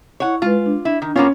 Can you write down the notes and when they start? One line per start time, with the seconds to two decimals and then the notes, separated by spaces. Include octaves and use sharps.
0.20 E4 C#5 F#5 C#6
0.42 G#3 F4 B4
0.66 D4
0.85 E4
1.02 D#3
1.16 A#3 B3 C#4 F4